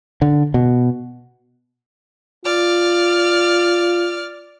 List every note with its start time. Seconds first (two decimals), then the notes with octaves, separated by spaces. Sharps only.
0.22 D3
0.54 B2
2.45 F4 D5 F6